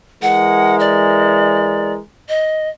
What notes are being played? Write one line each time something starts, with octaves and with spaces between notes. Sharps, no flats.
E3 G#3 A#4 F#5
D5
D#5